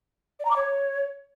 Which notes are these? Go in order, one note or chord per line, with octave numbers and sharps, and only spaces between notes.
D5
A#5
D6
C#5